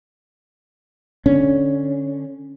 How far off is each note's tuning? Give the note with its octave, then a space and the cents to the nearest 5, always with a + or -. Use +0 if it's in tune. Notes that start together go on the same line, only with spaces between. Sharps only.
D3 +0 C#4 +0